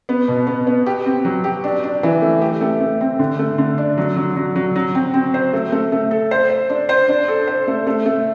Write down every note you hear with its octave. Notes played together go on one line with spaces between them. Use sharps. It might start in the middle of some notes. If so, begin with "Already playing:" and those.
B3
B2
B3
B3
G4
C4
F#3
G4
D4
D4
E3
A3
G4
A3
A3
C4
D3
A3
D3
D4
F#3
F#3
F#3
F#3
F#3
C4
C4
C5
A3
A3
A3
A4
C5
C5
D4
C5
D4
A4
C5
A3
A3
A3